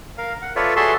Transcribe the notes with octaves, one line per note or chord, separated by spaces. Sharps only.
A#4 F5
F#5
F4 A4 B4 C#5 D5 E5
F#4 G#4 A4 E5 A5 C6